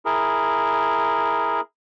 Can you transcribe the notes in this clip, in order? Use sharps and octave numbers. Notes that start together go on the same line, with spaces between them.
E4 G#4 A#4